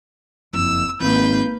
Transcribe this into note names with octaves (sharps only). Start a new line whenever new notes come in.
F#1 F2 E6
G#1 A#3 B4 G6